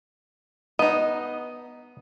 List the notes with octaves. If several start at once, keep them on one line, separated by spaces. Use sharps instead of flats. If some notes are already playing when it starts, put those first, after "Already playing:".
B3 D#4 D#5